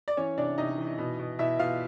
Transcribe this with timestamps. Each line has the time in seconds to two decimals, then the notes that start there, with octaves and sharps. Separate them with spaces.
0.08 D5
0.17 E3 C#4 C#5
0.38 C3 D4 D5
0.58 C3 D#4 D#5
0.78 E3
0.98 B2
1.19 B2
1.39 B2 E4 E5
1.59 B2 F4 F5